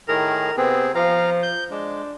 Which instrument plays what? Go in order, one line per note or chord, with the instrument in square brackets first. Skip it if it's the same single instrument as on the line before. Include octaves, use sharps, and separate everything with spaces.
[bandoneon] A2 D#3 G#4 [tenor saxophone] A#4
[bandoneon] C3 C4 G#4 [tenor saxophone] B3
[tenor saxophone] F3 [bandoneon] F5 A#5
[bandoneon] G6
[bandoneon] G#3 [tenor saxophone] D4